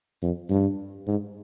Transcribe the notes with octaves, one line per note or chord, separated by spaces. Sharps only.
F2
G2
G#2